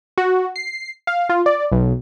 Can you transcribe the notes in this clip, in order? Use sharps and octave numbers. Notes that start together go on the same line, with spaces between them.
F#4
C7
F5
F4
D5
B1